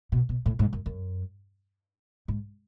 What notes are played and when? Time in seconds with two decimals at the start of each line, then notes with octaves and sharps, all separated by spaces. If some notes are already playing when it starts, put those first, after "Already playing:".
0.12 B2
0.29 B2
0.46 A2
0.59 G#2
0.73 F#2
0.86 F#2
2.28 G#2